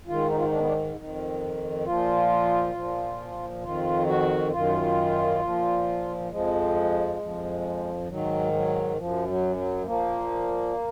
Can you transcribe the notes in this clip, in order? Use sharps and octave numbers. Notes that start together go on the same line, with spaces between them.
G#2 D#3 F4
D#4
F4
D#4
D4
B3
D4
F2 D#3
A#2 F3 F4
A#2 F3
F2 D#3 F4
F#4
F#2 D#3 F4
A#2 F3
F2 F3 G#3
F2 F3
G#2 D#3 F#3
F#3
F#2 F3
F#3
F#3
A#2 F3 A#3